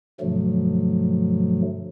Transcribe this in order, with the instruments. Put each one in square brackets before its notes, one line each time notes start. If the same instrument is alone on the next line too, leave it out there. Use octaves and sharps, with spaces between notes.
[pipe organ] G2 B2 D3 F3 F#3 A3